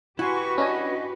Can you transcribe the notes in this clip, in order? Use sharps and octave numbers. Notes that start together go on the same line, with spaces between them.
E4 F#4 G4 B4 F#5 G#5 C6 C#6
C#4 D4 D#5 G#5